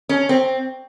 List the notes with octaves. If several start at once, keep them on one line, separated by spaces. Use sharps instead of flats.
C#4
C4